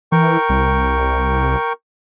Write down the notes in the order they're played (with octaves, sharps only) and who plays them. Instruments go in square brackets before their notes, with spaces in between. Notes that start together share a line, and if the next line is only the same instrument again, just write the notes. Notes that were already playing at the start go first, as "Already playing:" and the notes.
[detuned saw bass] E3 [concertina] A#4 G5 C#6
[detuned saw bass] C2